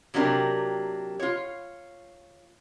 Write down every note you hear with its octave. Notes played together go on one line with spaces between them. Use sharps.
C3 F#3 A#3 D4 G4 A#4
F4 C#5